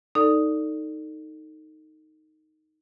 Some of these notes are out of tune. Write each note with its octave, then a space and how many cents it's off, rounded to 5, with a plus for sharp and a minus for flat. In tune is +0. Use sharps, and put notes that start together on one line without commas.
D#4 +0 A4 +20 D5 +0